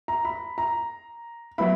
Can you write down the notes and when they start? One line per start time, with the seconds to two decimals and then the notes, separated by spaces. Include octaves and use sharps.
0.08 A#5
0.25 B5
0.58 A#5
1.58 F#3 B3 E4 B5